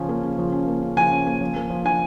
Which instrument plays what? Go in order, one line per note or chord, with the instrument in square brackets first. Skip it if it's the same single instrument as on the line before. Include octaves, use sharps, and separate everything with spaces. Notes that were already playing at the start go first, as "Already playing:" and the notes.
Already playing: [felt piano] C#3 F3 C#4
A#3
C#3
F3
C#4
A#3
C#3
[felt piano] F3 [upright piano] G#5
[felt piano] C#4
A#3
F3
A#3
F3
[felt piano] D4 [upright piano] G#5